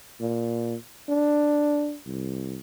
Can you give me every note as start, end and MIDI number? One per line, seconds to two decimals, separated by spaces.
0.20 0.75 46
1.09 1.96 62
2.06 2.59 36